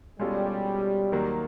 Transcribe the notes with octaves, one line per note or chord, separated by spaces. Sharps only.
B2 G3 G#3 C#4 F4 A4
D#2 D#3 F#3 A#3